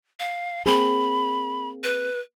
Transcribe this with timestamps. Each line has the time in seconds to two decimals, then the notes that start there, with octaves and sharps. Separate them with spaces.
0.20 F5
0.66 A#3 C4 G#4 B5
1.84 B4